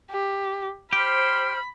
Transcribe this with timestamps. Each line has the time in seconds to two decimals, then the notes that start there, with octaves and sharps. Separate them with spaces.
0.11 G4
0.93 G4 C5 B5 F6